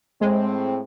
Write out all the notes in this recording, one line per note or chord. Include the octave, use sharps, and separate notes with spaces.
A2 G#3 C4